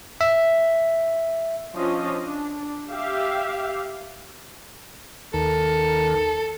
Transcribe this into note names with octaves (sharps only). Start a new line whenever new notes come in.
E5
F3 C#4 D4 F4 D#5
D4
G4 E5 F5
D#2 D#3 A4 A#4